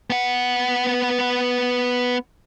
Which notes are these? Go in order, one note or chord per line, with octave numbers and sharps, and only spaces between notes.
B3 F#5